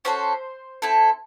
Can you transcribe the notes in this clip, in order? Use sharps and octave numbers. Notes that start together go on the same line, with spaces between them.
C#4 F#4 A4 C5
C4 E4 A4